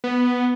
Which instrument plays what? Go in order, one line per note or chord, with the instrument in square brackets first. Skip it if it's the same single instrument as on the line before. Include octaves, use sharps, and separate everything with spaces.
[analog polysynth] B3